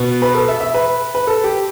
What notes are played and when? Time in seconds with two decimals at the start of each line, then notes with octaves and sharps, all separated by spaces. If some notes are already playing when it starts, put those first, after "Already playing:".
Already playing: B2 B3
0.22 B4
0.35 A4
0.48 E5
0.61 E5
0.74 B4
1.15 B4
1.27 A4
1.44 G4